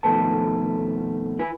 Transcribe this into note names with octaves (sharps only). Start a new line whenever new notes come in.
F2 B2 D#3 A3 B4 A5
E4 B4 G#5